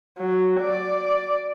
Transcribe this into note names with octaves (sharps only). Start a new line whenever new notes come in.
F#3
D5